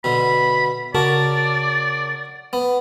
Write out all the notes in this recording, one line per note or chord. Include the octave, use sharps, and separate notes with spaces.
B2 D3 E5 B5
C#3 F#4 A#4 D5 A5
B3